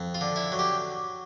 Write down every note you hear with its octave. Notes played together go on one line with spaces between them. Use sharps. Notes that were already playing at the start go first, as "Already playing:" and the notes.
Already playing: F2
F4
D3
E4
F#3
G4